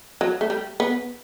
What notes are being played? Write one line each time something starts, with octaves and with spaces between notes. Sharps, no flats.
F#3
A3
G3
B3